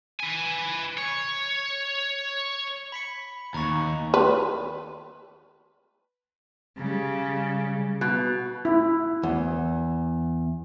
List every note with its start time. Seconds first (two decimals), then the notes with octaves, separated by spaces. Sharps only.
0.20 B4 G#5
0.98 C#5
2.92 B5 B6 C#7
3.54 D#2 A#5 C#6
4.14 B4
6.77 C#3 G3
8.01 B2
8.65 E4
9.23 E2